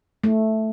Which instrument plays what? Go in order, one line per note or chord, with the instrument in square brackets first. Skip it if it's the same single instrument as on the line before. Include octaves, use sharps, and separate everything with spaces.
[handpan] A3